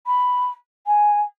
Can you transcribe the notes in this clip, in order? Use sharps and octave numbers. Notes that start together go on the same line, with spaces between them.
B5
G#5